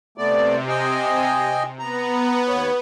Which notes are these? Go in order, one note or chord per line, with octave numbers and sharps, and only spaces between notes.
C3 A3 B3 D5
D#5 G5 G#5
B3 A#5
D#2 C#5